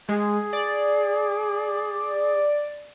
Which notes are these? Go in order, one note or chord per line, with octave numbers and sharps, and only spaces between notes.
G#3 G#4
D5